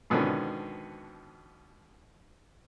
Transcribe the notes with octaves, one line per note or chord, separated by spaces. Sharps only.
G#2 B2 D3 D#3 F3 C#4